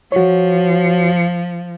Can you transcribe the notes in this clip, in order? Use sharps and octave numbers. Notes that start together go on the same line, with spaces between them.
F3 F#4 C#5